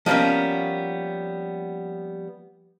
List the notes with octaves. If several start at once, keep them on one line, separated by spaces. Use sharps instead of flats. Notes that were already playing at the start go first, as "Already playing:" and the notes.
F3 G3 A#3 B3 C#4